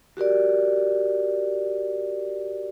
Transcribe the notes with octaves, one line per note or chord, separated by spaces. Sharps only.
F#4 G4 A#4 D5